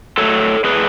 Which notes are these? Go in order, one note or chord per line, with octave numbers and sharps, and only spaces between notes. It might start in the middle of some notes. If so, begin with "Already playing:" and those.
F#3 A3 A4 C#5
A2 G#4 B4